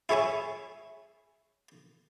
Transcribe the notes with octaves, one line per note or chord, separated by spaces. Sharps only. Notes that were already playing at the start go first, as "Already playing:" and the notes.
E4 G#4 C#5 E5 G#5